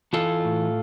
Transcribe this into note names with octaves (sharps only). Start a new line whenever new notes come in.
E3 F4 A4
A2